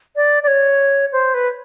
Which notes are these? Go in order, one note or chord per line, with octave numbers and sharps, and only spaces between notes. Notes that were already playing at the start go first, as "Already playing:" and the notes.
D5
D5
C#5
C5
B4